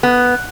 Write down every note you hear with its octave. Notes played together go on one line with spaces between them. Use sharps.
B3